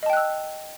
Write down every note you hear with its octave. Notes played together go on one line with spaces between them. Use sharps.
D#5 G5 A5 E6 F#6